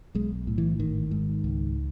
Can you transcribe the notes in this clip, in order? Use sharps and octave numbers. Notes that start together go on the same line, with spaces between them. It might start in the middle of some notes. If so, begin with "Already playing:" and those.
B1 G#3
A2
E3
G#1 D#3
G#2
C#2